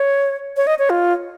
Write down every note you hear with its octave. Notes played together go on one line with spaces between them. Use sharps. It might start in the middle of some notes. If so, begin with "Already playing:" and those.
Already playing: C#5
C#5
D#5
C#5
F4